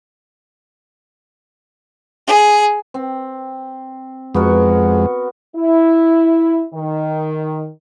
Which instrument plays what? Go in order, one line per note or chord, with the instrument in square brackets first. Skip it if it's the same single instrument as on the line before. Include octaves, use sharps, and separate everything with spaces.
[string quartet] G#4
[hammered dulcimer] C4
[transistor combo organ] F2 G#3 [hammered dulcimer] B3 F#4 A#4
[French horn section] E4
D#3